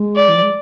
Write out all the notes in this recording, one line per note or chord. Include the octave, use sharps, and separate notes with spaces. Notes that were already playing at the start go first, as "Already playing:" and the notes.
Already playing: G#3
D5
E3
F3
G#3